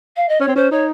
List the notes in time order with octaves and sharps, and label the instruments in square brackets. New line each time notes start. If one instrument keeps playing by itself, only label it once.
[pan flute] F5
D#5
[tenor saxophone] C#4 [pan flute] C#5
[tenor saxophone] C4
[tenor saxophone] C#4 [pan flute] C5
[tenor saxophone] D#4 [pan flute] C#5